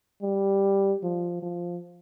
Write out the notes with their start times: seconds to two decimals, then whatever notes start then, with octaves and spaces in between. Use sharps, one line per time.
0.23 G3
1.03 F3
1.43 F3